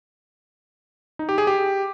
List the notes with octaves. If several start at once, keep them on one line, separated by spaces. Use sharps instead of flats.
D#4
G4
G#4
G4